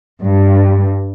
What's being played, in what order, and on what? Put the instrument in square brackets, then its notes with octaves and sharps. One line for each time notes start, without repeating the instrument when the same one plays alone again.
[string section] G2